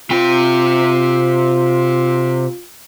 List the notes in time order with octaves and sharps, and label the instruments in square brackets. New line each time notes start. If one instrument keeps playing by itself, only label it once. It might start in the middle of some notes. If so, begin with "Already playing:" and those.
[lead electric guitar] C3 G5 [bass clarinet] F4